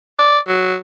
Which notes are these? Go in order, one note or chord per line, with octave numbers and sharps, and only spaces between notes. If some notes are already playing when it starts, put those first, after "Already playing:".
D5
F#3